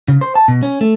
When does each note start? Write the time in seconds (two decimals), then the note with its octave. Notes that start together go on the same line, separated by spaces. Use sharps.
0.08 C#3
0.21 C5
0.35 A5
0.48 B2
0.63 C#4
0.81 A3